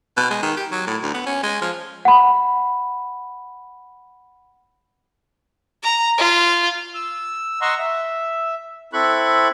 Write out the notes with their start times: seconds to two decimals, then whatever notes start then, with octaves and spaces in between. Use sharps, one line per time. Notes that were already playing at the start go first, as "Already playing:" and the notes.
0.17 B2
0.31 G#3
0.42 D#3
0.57 G4
0.71 F#3
0.87 A2
1.02 D2
1.14 B3
1.26 C#4
1.43 G#3
1.62 F3
2.05 F#5 B5
5.83 A#5
6.18 F4
6.94 E6
7.61 D#5 F#5 A#5 C6 C#6 E6
7.78 E5
8.93 C4 E4 A4 B5 C#6 F#6